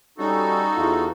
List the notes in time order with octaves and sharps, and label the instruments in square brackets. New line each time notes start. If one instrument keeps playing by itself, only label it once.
[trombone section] G3 C#4 [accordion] D#4 F#4 A4
[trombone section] E2 B3 F4